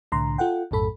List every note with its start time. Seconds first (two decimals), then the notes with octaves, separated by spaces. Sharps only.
0.12 C2 A2 D3 A#5 C6
0.38 F4 A4 F#5 G5
0.71 B1 F#2 A2 A4 B5